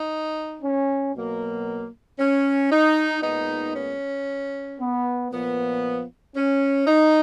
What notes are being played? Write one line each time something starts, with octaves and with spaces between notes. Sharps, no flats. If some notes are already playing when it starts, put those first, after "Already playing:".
Already playing: D#4
C#4
B2 F#3 A#3
C#4
D#4
A#2 G#3 B3 D#4
C#4
B3
A#2 F3 B3
C#4
D#4